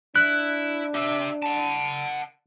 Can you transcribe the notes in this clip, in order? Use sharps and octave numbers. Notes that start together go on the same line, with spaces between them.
D4 E4 F#6
G4 E5
F#5 A5